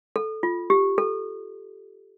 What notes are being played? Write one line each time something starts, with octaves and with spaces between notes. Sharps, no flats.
A4
F4
G4
A4